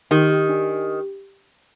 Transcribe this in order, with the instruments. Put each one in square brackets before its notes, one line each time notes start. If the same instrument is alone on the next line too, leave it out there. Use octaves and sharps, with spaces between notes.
[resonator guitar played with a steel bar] D#3 [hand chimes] G4
[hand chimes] G4
D4
G4